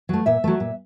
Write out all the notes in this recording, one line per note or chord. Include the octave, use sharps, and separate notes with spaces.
F#3 A3
A#2 E5
F#3 A3
A#2